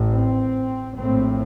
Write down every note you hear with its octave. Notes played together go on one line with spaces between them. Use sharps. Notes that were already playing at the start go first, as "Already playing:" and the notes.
Already playing: A1 A2
C4
A#1 A2 C4